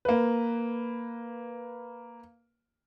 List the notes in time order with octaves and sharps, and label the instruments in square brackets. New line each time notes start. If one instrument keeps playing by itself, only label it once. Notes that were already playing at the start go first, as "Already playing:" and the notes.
[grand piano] A#3 B4